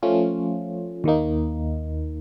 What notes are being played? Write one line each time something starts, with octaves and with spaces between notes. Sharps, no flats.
F3 A3 C#4 F4
D#2 D#3 A#3 D#4